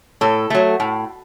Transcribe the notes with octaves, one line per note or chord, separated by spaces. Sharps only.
A2 A4
F#3 A3
A2